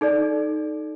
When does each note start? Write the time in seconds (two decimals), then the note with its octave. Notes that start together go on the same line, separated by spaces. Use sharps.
0.01 D#4 A4 D5